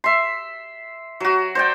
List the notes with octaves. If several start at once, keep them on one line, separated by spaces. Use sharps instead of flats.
E5 C6
F#3 F#4
C5 D5 G5